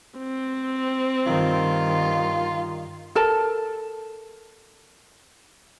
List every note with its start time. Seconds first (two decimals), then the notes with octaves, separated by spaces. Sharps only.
0.18 C4
1.26 G2 D#3 F4
3.15 A4 A#4 A5